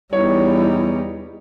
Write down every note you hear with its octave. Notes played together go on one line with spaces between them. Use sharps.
E2 G3 D#4 E4 C#5